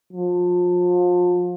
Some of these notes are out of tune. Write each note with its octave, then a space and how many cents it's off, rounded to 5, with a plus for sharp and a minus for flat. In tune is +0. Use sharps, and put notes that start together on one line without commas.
F3 +30